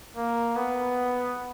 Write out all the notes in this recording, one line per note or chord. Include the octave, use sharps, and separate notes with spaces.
A#3
B3